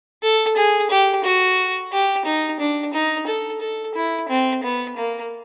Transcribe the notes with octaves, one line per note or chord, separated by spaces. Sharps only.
A4
G#4
G4
F#4
G4
D#4
D4
D#4
A4
A4
E4
C4
B3
A#3